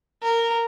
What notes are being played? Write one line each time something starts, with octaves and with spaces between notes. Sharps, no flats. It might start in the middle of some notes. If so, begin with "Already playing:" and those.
A#4